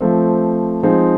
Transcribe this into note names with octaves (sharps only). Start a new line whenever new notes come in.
F3 A3 C4
F3 G#3 C4 D#4 G#4